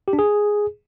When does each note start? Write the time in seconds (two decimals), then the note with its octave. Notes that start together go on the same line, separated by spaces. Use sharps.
0.08 G4
0.13 D4
0.19 G#4